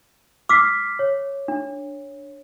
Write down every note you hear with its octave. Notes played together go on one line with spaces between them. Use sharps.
D6 E6 F6 B6 C7
C#5
D4